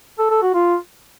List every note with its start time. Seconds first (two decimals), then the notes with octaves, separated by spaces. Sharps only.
0.18 A4
0.30 A4
0.42 F#4
0.54 F4